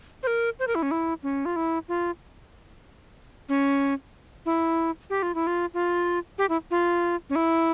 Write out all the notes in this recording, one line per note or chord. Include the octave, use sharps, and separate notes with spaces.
C5
A#4
C5
A#4
E4
C#4
E4
C#4
F4
E4
F4
C#4
E4
G4
F4
E4
F4
F4
G4
E4
F4
C#4
E4